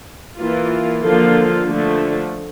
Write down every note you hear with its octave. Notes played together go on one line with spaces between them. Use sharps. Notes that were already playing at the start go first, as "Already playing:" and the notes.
E3 A#3 F4
D3 F3 A#3 F4 A4
D3 F3 A3